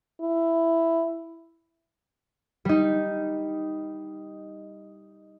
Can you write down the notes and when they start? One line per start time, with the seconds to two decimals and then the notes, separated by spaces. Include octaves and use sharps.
0.21 E4
2.65 G3 D#4